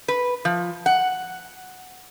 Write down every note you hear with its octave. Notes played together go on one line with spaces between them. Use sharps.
B4
F3
F#5